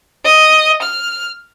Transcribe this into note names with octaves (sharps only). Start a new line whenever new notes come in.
D#5
F6